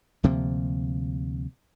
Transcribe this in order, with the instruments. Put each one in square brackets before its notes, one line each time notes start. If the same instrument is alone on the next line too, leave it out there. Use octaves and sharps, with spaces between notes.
[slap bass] D2 C3 F3 A#3